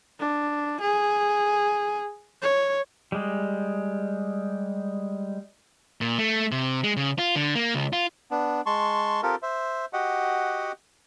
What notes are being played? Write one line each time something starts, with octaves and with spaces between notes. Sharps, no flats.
D4
G#4
C#5
G3 G#3
A#2
A3
C3
G#3
C#3
F4
D3
A#3
C#2
F4
B3 D4
G#3 A5 C6 C#6
C4 F4 G4 A4 A#4
C5 E5
F#4 G4 D#5 F#5